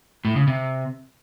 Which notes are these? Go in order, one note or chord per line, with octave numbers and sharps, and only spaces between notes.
A2
C#3
C3